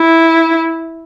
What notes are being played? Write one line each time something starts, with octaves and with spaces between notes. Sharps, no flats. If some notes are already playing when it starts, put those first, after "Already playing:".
Already playing: E4